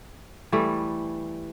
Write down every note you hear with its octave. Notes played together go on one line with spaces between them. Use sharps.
E3 G3 A3